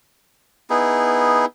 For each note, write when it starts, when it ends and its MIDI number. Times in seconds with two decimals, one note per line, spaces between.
0.70 1.45 59
0.70 1.45 63
0.70 1.45 64
0.70 1.45 68